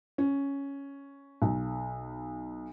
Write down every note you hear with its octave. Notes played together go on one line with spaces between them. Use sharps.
C#4
B1